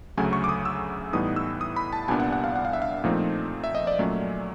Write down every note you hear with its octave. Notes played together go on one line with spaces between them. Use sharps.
D2 C#3 F#3 A3 G#5
C#6
D6
D#6
E6
A2 E3 G3 B3 D#4 D#6
E6
D#6
B5
A5
C2 A#2 G3 B3 D4 G#5
F#5
F#5
F5
F#5
F5
E5
F5
A#2 F3 A3 C4 D#4
E5
D#5
D5
A#2 F#3 A3 C#4